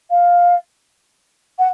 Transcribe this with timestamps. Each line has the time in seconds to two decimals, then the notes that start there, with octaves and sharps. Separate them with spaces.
0.10 F5
1.59 F#5